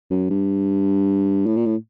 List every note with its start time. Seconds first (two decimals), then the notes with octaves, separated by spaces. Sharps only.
0.10 F#2
0.30 G2
1.46 A2
1.56 A#2
1.66 A2